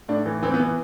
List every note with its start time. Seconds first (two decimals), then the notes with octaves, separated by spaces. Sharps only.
0.08 A2 D4
0.26 E3
0.43 E3 C4
0.54 B3
0.60 E3